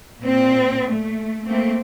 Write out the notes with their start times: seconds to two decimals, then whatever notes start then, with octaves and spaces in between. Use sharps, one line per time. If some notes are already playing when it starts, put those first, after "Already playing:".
0.20 A#2 C4
0.90 A3
1.46 A3 A#3 C4